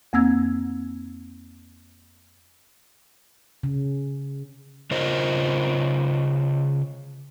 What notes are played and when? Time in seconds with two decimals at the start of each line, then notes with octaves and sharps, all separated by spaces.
0.13 F2 A#3 C4 E6 G#6
3.63 C#3
4.91 C#3 F4 A#4 C5 D#5